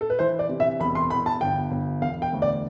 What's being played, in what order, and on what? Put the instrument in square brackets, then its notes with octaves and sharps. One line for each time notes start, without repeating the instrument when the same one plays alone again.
[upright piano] A4
B4
E3 C5
D5
C3
E5
E1 B5
C6
E2 B5
A5
G1 G5
G1
E1 F5
G5
D2
D5